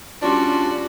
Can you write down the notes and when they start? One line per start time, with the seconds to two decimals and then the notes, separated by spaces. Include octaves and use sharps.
0.22 G3 C#4 D4 F4 F#4